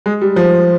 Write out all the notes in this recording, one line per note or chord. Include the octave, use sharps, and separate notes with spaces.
G#3
G3
F3